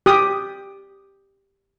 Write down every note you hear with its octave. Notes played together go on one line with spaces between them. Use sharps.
G4 D#6